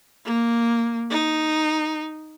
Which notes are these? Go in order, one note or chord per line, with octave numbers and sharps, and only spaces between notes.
A#3
D#4